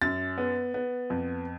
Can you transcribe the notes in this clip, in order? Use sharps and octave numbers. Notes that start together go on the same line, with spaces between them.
F#2 A6
B3
B3
F2